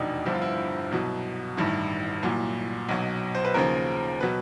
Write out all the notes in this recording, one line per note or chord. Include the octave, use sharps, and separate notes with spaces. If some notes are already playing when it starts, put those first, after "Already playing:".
Already playing: F1 E2 B2 D4 D#4
G1 G2 D3 F3 E4
F4
E4
C2 B2 F#3
A1 G2 D#3 E4
C2 A#2 F#3
B1 B2 F#3
C5
B4
D#2 C#3 F3 A#4
B2 F#3 B4